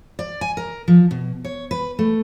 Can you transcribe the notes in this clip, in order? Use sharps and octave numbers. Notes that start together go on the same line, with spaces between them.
D5
G#5
A#4
F3
B2
C#5
B4
A3